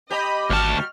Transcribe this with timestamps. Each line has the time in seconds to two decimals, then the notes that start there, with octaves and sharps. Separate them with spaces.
0.11 G4 D#5 B5
0.50 G#1 D2 G3 F#4 A5 F6